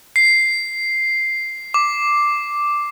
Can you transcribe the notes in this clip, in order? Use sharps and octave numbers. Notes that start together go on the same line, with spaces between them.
C7
D6